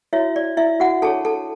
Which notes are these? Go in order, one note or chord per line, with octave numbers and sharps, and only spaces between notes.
E4 F#4 C#5 E5
D5
E4 E5
F#4 F#5
D4 G#4 A4 C#5 A5
A4 A5